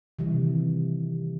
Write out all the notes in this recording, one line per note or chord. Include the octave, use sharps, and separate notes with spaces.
C3 D#3 E3 G3